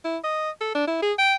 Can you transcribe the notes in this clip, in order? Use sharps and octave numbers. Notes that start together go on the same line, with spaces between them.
E4
D#5
A4
D4
E4
G#4
G5